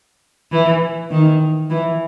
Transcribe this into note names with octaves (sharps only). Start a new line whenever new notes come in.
E3
D#3
E3